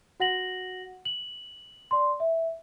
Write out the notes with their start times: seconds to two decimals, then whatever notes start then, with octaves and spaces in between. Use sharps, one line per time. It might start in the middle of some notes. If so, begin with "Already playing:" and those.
0.20 F#4 F#5 A#6 F#7
1.05 F#7
1.91 D5 C6
2.20 E5